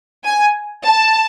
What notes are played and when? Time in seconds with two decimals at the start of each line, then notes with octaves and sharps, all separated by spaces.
0.25 G#5
0.83 A5